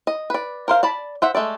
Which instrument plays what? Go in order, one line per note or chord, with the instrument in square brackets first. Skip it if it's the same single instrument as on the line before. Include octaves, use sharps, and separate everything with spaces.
[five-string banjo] D#5
B4 D5
A#4 C5 F5
D5 A5 B5
C5 E5 F#5
G#3 A3 A4 D5